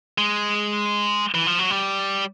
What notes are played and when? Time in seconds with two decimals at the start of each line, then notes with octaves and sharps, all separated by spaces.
0.18 G#3
1.34 E3
1.46 F3
1.59 F#3
1.70 G3